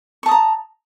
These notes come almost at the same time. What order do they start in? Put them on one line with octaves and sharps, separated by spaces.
C#6 A5 D#6 A#5